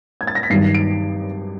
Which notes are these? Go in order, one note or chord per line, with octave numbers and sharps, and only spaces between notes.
G#6
A6
A#6
B6
G2 D#3 F#3 C7
D7